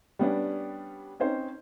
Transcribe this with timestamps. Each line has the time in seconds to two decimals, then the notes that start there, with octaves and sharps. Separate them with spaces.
0.19 G3 B3 C#4 D4
1.20 C4 C#4 D#4 C5